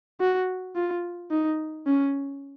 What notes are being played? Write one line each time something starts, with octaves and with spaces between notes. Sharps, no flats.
F#4
F4
D#4
C#4